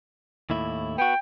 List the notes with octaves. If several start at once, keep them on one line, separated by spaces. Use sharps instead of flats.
D#2 A2 E4
B3 F#4 G5